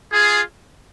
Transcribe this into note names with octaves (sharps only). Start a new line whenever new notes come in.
F4 G#4